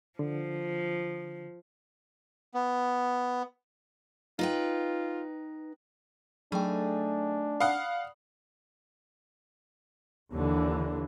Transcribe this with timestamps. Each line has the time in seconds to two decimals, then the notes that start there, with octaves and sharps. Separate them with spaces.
0.19 D3 F3
2.54 B3
4.39 D#4 F4 B4 G5
6.52 F#3 A3 D4 D#4 G#4 G5
7.60 D5 F5 F#5 B5 D#6
10.32 D#2 D3 E3